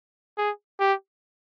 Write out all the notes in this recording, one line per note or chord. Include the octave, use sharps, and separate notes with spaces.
G#4
G4